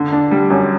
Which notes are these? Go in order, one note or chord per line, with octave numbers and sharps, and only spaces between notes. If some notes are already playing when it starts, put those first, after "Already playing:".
Already playing: D3
D4
G3
F#2